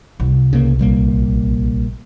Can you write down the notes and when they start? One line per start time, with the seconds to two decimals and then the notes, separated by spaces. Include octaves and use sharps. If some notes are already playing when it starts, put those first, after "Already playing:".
0.20 C2
0.53 C#3 A#3
0.79 A#1 G3 A#3